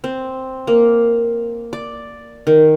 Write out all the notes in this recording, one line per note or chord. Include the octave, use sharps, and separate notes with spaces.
C4
A#3
D5
D#3